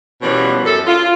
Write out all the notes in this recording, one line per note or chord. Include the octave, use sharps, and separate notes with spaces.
B2 E3 F3 G3 A#3 C#4
F#2 A4
F4